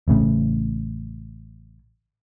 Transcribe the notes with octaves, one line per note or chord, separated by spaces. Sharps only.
A1 A2 C#3